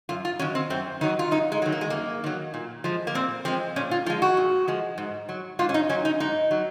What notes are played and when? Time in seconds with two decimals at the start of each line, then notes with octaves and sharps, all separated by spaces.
0.09 F#2 F4
0.25 F4
0.39 D#3 F#3 C#4
0.55 C4
0.70 F#2 C4
1.01 D#3 F#3 D#4
1.19 F4
1.31 F#2 D#4
1.52 G#3
1.62 D#3 F#3
1.72 A#3
1.81 G#3
1.90 F#2 A#3
2.24 D#3 F#3
2.54 A#2
2.84 F3 G#3
3.07 A#3
3.14 A#2 C4
3.45 F3 G#3 C4
3.76 A#2 C#4
3.91 F4
4.06 F3 F4
4.10 G#3
4.22 F#4
4.37 A#2
4.68 F3 G#3
4.98 G#2
5.29 F#3
5.59 G#2 F4
5.69 C#4
5.74 D#4
5.89 F#3 C#4
6.05 D#4
6.20 G#2 D#4
6.51 F#3